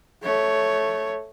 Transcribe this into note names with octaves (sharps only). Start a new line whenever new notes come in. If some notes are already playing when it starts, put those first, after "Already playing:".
A3 C#5